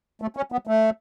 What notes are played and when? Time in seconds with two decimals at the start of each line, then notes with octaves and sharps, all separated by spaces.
0.22 A3
0.37 C#4
0.52 B3
0.67 A3